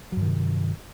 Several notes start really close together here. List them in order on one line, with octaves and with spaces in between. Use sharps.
F#3 G2 D#3 C3